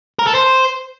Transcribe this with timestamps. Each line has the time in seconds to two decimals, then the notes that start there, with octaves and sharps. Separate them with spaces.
0.19 A#4
0.27 A4
0.35 C5